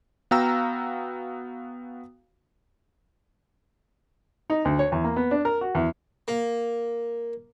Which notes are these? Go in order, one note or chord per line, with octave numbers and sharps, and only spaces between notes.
B3 F#4 F5 G5 A#5 E6
D#4
D2
C#5
E2
A#3
B3
D4
A#4
F#4
E2
A#3